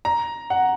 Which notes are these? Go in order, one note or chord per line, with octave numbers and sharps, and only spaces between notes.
A#5
F#5